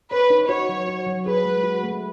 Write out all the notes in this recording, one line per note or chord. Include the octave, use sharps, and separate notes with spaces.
B4 C#5
D#4
F#4 C#5
F#3
F#4
F#3
G#4 B4
G#3
F#4
A3